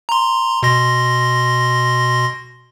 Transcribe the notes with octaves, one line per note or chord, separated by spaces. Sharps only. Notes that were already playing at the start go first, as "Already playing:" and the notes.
A#5 C6
B2 C6 A#6